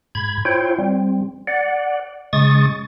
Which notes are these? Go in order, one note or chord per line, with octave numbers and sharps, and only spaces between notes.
G#2 B5 G#6
E4 F4 C5 C#5 G5
G3 C4
D5 F#5
C#3 G#3 C#6 D#6 A6